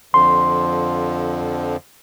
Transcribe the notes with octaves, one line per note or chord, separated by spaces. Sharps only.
F2 D3 F3 C6